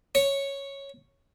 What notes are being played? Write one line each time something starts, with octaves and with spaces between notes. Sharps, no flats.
C#5